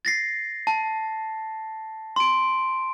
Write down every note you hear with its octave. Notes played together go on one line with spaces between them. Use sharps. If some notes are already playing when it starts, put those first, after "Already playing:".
A6 A#6 C7
A5
C6 D7